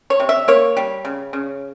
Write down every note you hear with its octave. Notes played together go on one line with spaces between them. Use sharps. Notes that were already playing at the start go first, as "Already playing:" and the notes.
C#5
C3
E5
A#3 C#5
G3
C#3
C#3